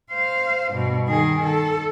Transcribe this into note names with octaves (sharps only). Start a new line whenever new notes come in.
C5 F5
G2 B2
D#3 G#4
A4